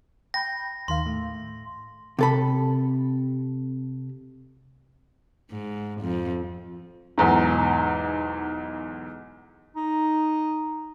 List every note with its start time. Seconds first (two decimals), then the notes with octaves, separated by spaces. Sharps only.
0.34 G5 B5 G6 A#6
0.88 D#2 D#3 F5 C6
1.05 A2 A3
2.19 C3 A4 B5
5.51 G#2
6.01 F2
7.18 B1 E2 G#2
9.76 D#4